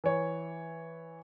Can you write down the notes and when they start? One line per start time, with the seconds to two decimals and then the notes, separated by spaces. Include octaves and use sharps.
0.04 E3 C#5